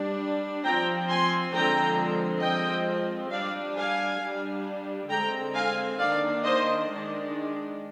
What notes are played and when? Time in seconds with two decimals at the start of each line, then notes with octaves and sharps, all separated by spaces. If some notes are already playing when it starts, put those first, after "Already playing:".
Already playing: G3 D4
0.65 F3 C4 G5 A#5
1.10 G#5 C6
1.54 D3 F3 G#3 C4 G5 A#5
2.43 F3 G#3 C4 D#5 G5
3.32 G3 D4 D5 F5
3.77 F5 G#5
4.21 G3 D4
5.10 D3 G#3 C4 G5 A#5
5.55 F5 G#5
5.99 D#3 A#3 D4 D5 F5
6.44 C5 D#5
6.88 D#3 G#3 D4